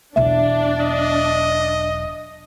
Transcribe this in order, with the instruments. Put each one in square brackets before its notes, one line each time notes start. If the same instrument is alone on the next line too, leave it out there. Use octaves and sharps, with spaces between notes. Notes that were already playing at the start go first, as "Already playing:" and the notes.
[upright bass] E1 B1 [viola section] D4 [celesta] E5
[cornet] D#5